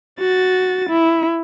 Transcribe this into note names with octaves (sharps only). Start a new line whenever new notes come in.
F#4 A6
E4